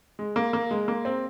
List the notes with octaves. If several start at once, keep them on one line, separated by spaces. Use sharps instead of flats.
G#3
A#3
A#3
G#3
A#3
C4